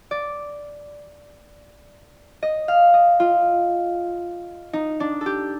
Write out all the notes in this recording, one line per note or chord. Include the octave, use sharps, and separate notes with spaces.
D5
D#5
F5
D#5
F4
D#4
D4
A4
G4